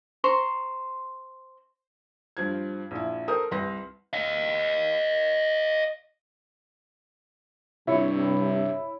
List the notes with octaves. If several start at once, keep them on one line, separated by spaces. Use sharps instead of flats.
C5 A#5 C6 C#6
G2 F3 G#6
A#1 E4
A4 A#4 C5 D#6 F6
C2 B4 C6 A#6
D#5 F5
G2 C3 E4 C#5